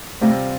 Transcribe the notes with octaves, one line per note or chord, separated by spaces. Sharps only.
C3 G3 A3 C4 F4